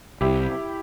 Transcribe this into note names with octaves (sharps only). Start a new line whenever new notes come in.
C2 E4 G4